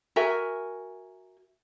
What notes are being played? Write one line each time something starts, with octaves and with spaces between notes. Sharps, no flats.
F#4 A#4 E5 G#5